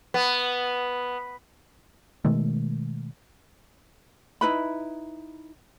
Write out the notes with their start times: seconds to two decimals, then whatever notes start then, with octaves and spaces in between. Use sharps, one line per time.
0.14 B3
2.25 B2 D#3 G#3 A3
4.41 D#4 E4 B4 B5